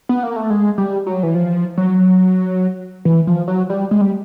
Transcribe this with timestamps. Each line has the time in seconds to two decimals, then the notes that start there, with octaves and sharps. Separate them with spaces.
0.09 B3
0.23 A#3
0.36 A3
0.50 G#3
0.78 G3
1.07 F#3
1.23 E3
1.35 F3
1.78 F#3
3.05 E3
3.27 F3
3.48 F#3
3.70 G3
3.91 G#3
4.01 G3